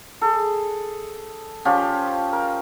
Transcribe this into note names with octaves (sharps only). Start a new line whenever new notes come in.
G#4 A4
F3 C#4 F4 G4
A#4